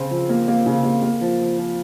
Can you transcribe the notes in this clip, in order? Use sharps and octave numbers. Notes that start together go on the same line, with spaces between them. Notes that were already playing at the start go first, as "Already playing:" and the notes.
Already playing: C#3 C4
F3
A#3
A#3
C#3
A#3
A#3
F3
F3
F3